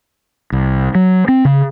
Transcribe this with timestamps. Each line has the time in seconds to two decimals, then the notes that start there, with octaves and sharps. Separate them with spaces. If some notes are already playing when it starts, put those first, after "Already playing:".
0.52 C2
0.95 F#3
1.28 C4
1.45 C#3